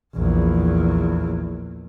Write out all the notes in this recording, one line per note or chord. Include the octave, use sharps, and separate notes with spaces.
A#1 E2